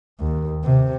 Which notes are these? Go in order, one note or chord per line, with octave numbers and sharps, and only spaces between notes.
D#2
C3